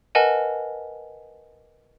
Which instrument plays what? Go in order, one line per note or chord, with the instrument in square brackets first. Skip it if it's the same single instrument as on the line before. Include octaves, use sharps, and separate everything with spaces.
[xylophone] A#4 B4 D#5 F#5 G#5 A5